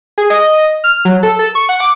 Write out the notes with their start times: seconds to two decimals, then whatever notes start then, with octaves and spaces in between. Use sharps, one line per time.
0.18 G#4
0.30 D#5
0.84 F6
1.05 F#3
1.23 A4
1.39 A4
1.55 C#6
1.69 F#5
1.80 D6